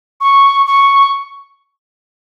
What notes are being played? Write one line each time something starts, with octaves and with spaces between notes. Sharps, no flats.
C#6
C#6